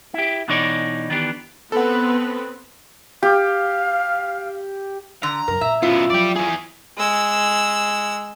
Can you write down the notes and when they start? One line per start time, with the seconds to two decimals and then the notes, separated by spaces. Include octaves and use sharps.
0.14 E4 G4
0.48 B2 E3 D4 D#4 C#5 D5
1.10 D#3 E3 B3 D4 G4
1.72 B3 C4 A4 B4 F#5
3.23 G4 F5
5.23 D3 A#5
5.48 F#2 C#3 A#4
5.61 A#2 E5
5.83 F#2 B3 E4 F4
6.10 F3 F#3 D5 G5
6.36 E3 G#4
6.97 G#3 E6